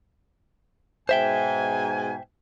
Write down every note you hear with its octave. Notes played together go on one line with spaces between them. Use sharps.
G#2 B2 C5 E5 G5 G#5